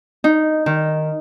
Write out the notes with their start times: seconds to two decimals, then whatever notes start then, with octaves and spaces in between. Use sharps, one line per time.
0.24 D#4
0.66 D#3